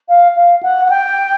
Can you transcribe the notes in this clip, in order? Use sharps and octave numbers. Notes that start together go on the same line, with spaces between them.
F5
F5
F#5
F#5
G5